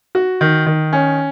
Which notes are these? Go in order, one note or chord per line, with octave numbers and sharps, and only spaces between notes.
F#4
D#3
D#3
C#4